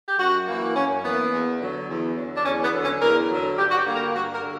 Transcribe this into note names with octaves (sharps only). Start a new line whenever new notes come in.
G4
F#2 F#4
E3 A#3
F#2 C#4
E3 A#3 B3
E2
D3 F#3
E2
D3 F#3
D4
E2 C#4
B3
D3 F#3
C#4
E2 A#4
D3 F#3
G2 G4
F#4
G4
D3 G3 A#3
A#4
G2 F#4
A#4
D3